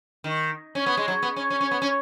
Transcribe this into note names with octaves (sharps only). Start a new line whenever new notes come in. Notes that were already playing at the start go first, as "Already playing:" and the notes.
D#3
C#4
B3
G#3
F#3
B3
C#4
C#4
C#4
B3
C#4